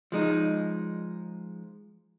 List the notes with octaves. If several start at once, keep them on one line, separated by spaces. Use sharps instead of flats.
F3 G#3 D#4